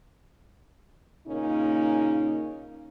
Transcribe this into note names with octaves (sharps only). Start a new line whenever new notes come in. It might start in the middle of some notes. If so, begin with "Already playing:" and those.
A#2 C#3 A#3 C#4 D#4